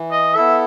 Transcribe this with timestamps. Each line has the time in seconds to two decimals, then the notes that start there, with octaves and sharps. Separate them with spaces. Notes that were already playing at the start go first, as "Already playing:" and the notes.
Already playing: E3
0.11 D#5
0.35 B3 E4 A4 E5